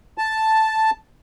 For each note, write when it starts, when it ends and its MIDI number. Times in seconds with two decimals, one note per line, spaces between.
0.18 0.90 81